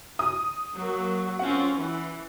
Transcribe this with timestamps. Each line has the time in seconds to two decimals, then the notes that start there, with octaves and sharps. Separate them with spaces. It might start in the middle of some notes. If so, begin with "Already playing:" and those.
0.19 D#6
0.75 F#3 A#3
1.39 C4 C#4 F4 F#5
1.75 E3